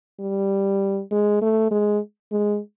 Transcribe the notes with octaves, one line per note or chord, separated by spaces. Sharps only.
G3
G#3
A3
G#3
G#3